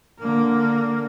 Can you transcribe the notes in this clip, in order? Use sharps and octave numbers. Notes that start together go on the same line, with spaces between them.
D3 A#3